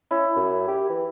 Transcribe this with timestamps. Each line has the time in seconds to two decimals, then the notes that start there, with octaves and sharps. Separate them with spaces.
0.11 C#4 E4
0.36 F#2
0.68 G4
0.90 E3